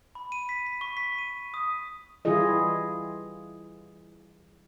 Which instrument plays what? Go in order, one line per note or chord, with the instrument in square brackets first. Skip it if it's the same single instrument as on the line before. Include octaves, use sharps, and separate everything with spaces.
[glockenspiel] B5
D#7
B6
B6
C#6
B6
D#7
D#6
[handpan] E3 G3 E4 F4 G#4 D#5